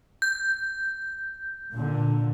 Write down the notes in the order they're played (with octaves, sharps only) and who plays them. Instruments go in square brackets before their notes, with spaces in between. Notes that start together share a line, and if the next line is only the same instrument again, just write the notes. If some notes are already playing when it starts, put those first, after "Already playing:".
[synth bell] G6
[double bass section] A#2 D3